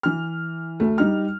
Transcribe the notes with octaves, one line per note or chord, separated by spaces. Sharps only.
E3 F6
D2 A3
G3 D#4 F6